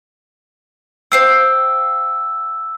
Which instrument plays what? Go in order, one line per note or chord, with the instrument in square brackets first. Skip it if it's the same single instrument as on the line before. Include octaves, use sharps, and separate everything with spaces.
[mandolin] C5 F5 G5 [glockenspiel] E6